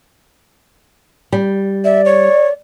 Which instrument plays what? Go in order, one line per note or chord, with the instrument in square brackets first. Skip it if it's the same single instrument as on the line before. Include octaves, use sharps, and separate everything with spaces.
[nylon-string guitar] G3
[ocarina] D5 [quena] E5
[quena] C#5